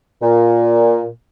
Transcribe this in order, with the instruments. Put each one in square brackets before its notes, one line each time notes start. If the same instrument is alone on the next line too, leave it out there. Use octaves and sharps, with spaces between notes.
[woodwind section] A#2